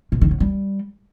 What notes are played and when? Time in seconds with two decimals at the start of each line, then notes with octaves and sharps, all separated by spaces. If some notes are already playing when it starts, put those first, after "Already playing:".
0.12 A#2
0.21 D#3
0.31 F#3
0.40 G3